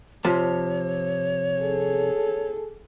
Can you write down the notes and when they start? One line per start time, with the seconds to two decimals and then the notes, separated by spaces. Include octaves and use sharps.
0.25 C3 F3 C#5 A5
1.61 G#4 A4